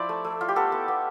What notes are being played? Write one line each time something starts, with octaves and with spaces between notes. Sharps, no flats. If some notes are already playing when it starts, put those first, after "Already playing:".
Already playing: F3 E4 C5 D5
A3
A3
E4 F4
G4
B3 A4
B3
B3